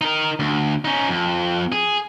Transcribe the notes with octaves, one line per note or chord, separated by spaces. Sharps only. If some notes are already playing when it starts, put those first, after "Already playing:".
D#4 A#4
D2
C#4 D#4
F2
G#4